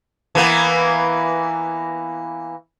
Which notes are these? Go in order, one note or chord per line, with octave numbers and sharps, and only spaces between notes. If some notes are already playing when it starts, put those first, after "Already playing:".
E3 A#3 B3